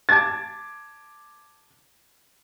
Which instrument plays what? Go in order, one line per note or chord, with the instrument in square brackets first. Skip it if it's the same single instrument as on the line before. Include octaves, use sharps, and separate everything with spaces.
[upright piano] A5 D6 G#6 A6